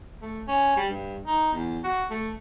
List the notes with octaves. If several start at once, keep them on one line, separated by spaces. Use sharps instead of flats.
A3
C#4
G3
G2
D#4
E2
F#4
A3